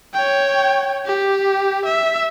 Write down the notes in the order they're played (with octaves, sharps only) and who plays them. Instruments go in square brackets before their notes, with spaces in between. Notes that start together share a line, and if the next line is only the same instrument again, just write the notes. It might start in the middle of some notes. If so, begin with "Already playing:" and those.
[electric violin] C#5 G5
G4
E5